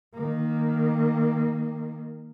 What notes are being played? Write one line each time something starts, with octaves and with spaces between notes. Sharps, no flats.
D#3 A#3